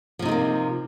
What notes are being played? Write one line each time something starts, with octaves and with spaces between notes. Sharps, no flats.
C3 F3 A3 A#3 D#4